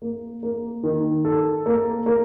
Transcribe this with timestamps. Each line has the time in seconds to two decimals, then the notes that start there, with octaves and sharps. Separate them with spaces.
0.02 A#3
0.43 A#3
0.83 D#3
1.25 A4
1.66 A#3
2.06 A#3